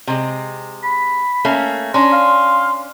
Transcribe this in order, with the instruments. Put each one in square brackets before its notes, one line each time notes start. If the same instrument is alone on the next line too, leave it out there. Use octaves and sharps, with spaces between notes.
[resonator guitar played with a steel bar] C3 G#3
[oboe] B5
[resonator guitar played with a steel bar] A3 A#3 C#4
[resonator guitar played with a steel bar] C#4 D4 [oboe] A#5 [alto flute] C6
[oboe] F5